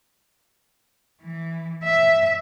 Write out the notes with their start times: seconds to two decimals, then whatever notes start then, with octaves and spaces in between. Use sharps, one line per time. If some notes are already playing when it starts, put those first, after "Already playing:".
1.22 E3
1.84 E5